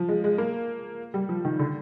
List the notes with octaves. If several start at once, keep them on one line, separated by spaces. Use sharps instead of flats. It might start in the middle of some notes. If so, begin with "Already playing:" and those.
Already playing: F3
G#3
G#3
A#3
G3
F3
D#3
D3